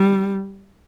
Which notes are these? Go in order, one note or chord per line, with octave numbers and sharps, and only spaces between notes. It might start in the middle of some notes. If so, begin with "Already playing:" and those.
Already playing: G3